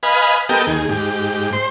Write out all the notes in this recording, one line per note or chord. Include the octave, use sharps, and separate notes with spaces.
B4 D#5 F5 G#5 B5
B3 G4 A4 A#4 D#5 G5
D#2 G#4
G#2 G4
C5 C6